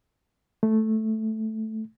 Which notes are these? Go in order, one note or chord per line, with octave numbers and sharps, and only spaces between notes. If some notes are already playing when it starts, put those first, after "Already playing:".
A3